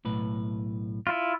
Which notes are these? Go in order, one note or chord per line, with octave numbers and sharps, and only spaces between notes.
B1 A2 B4
E4 F4